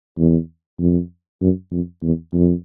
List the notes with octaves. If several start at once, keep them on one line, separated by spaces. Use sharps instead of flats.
E2
F2
F#2
F2
E2
F2